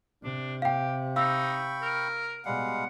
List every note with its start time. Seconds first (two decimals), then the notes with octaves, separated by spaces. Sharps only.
0.23 C3 D4
0.62 G4 F5 G5
1.16 D#4 F5 G5 B5 C#6 E6
1.82 A#4
2.45 B2 G3 G#3 F5 F#5